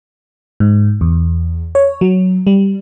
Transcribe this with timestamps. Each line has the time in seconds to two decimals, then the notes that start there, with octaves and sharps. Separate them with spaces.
0.60 G#2
1.01 E2
1.75 C#5
2.01 F#3
2.47 G3